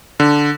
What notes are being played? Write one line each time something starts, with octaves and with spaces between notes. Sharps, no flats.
D3